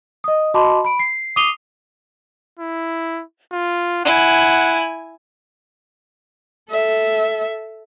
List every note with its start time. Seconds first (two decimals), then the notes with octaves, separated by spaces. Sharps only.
0.24 D#5 D#6
0.54 F#4 D#5 A5 B5 C6 D6
0.85 B5 D7
0.99 C7
1.36 D6 D#6 C7 D#7 F7 G7
2.59 E4
3.52 F4
4.05 E4 F#5 G#5
6.71 A4 E5